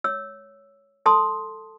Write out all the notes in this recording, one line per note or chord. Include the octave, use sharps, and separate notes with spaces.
C#5 E6
A4 A5 C6 D#6